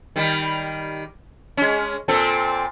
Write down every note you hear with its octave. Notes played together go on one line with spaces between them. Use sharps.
D#3 G3
G#3 C#4
A#2 C4 A4